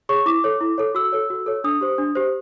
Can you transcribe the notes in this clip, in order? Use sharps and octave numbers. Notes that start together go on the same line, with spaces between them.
G#4 C#5 C#6
E4 D6
A4 C#5
E4
A4 C#5
F#4 E6
A4 C#5
F#4
A4 C#5
D4 D#6
G4 C5
D4
G4 C5